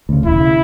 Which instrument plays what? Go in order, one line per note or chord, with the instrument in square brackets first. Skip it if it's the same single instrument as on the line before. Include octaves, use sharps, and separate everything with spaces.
[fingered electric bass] D2 C#3
[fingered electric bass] E1 [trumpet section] E4
[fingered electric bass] C#3